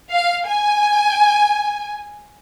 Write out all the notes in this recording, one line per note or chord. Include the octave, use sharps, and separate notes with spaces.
F5
G#5